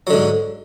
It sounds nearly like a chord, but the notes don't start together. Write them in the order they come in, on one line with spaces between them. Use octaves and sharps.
F#3 D3 G#2